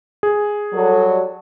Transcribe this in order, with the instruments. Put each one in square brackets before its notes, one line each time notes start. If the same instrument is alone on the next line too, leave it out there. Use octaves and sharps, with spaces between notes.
[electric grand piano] G#4
[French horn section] F#3 G3 A4